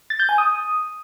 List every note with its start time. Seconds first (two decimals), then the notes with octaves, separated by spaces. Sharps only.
0.10 A6
0.20 G6
0.29 G#5
0.38 D#6